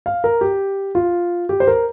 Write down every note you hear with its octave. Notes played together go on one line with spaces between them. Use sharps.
F5
A#4
G4
F4
G4
C5
A#4